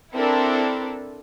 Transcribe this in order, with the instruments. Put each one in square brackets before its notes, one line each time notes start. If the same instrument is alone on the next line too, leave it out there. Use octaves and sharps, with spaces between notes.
[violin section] C4 D4 E4 A4 A#4